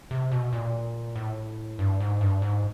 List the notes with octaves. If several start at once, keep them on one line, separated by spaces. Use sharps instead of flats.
C3
B2
A#2
A2
G2
G#2
G2
G#2